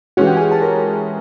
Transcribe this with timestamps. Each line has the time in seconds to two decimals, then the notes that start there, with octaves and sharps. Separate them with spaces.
0.17 E3 G#3 C#4 F#4 F#5
0.26 G4 G5
0.37 G#4 G#5
0.52 A5
0.62 A#4 A#5